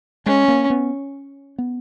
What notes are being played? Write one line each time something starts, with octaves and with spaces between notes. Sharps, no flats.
G#3 C#4
A#3
B3
B3